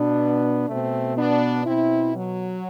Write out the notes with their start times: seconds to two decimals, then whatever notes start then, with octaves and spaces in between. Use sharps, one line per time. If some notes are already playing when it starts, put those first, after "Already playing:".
Already playing: B2 B3 D4
0.68 B2 A3 C4
1.17 B3 D4
1.66 B2 C4 E4
2.15 F#3